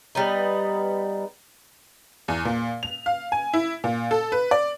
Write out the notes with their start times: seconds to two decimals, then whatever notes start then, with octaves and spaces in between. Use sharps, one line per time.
0.15 G3 B3 D#4
2.28 E2
2.45 A#2
2.83 F7
3.06 F5
3.32 G#5
3.54 E4
3.84 A#2
4.11 A4
4.32 B4
4.51 D5